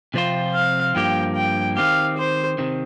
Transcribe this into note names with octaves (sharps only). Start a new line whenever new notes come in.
C3 F3 C4 F4 C5
F5
G2 F3 A#3 G4 G5
G5
D#3 C4 G4 F5
C5
C3 D#3 C4